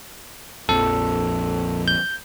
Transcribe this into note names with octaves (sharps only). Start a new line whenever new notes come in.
A#1 F2 A4
G6